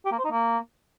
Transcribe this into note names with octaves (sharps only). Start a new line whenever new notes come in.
G4
A#3
C5
D#4
A#3